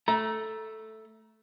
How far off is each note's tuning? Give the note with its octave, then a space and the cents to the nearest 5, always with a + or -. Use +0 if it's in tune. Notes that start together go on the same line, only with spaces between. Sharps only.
A3 +0 A#5 +20